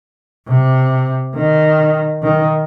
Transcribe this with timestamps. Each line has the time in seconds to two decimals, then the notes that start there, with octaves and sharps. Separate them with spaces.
0.47 C3
1.35 D#3
2.23 D#3